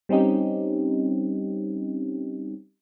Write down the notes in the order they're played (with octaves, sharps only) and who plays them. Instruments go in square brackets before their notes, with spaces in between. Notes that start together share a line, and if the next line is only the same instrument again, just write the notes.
[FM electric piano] G3 C4 C#4 D#4 G4